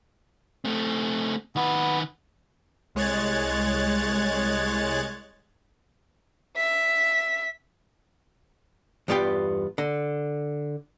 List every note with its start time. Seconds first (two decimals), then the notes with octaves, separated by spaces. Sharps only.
0.65 A3 C4
1.56 D#3 B3 B4
2.95 C2 G#3 C#5 F#6 G#6 A6
6.57 E5 B6
9.08 E2 G2 B3 F4 G4 G5
9.78 D3